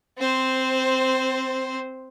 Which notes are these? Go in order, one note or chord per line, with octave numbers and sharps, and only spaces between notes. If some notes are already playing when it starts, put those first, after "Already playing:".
C4 C5